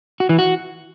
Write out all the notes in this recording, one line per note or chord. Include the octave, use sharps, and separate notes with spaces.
F#4
E3
F#4